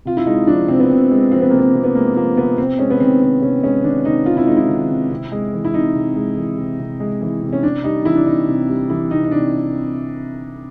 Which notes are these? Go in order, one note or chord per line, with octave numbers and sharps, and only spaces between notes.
C3 F4
E4
G#3 D#4
F3 D4
C3 C4
B3
C3 C4
G#3
F3 C4
B3
C3 A#3
B3
C3
B3
G#3 A#3
F3 A#3
C3 B3
C3 C4
G#3 C#4
B3
D#3 C4
C3 C4
C3 C#4
G#3 C#4
D#3 D4
C3 D#4
C3 F4
E4
G#3 D#4
E4
D#3
C3
C3
G#3
E3
E4
C3 D#4
C3
G#3
E3
C3
C3
G#3
E3
C3
C#4
C3 D4
G3 D#4
E3 E4
D4
C3 D#4
C3
G3
E3 E4
C3 D#4
D#4
C3 D4